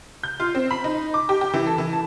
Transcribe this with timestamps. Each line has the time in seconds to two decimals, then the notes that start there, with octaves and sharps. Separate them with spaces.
0.23 G6
0.40 F4
0.55 C4
0.71 B5
0.84 D#4
1.14 D6
1.29 G4
1.41 G4
1.54 E3
1.67 A4
1.78 E3
1.93 A5